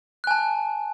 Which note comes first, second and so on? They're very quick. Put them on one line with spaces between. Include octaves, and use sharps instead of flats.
F#6 G#5 A5